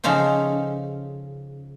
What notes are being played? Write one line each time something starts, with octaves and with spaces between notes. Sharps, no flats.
C#3 F3 C#4 D#4 A4 C5